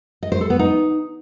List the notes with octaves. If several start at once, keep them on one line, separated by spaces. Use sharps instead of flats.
D#5
C5
A4
B3
D#4